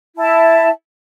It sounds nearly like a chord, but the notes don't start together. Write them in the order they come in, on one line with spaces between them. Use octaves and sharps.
E4 A5 E5